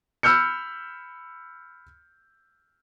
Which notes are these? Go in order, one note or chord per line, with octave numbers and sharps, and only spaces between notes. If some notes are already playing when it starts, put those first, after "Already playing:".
B5 E6 F6 G6 C#7